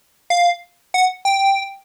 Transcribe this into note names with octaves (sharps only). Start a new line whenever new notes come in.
F5
F#5
G5